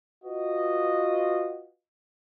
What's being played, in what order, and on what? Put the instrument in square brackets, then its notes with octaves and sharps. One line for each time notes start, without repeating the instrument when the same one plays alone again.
[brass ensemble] F4 F#4 B4 D#5